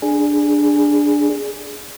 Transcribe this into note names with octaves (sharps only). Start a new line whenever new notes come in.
D4 G#4